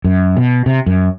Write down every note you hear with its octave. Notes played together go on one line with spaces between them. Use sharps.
F#2
B2
C3
F#2